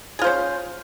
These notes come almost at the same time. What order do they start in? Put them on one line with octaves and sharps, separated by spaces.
G#4 F4 C5 C#4